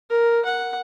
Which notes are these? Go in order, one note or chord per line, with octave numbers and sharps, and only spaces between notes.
A#4
F#5